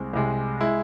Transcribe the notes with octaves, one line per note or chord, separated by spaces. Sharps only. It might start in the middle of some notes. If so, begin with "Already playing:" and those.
Already playing: C2 C3 G#3 C4
C2 C3 G#3
G#3 E4